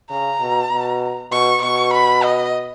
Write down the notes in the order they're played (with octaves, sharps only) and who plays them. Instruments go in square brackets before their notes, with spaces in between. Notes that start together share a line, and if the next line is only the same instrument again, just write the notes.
[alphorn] C#3 [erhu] A#5
[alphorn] B2
B2
[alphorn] B2 [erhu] C#6
[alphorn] B2 [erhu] C#6
[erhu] B5
D#5